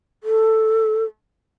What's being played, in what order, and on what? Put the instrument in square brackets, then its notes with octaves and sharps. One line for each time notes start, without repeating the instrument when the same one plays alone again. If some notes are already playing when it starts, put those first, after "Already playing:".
[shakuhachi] A4